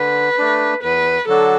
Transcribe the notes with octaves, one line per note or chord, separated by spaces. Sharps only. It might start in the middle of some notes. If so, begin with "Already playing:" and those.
Already playing: D3 B4
A3 D4
E2 B4
D3 F#3 D4 F#4 A4